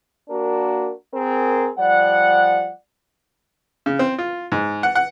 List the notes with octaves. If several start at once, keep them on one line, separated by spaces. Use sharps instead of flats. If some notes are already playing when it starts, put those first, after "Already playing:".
A#3 D4 F#4 A#4
C4 G#4 A#4
F3 G3 D5 F#5
C#3
C4
F4
G#2
F#5
F#5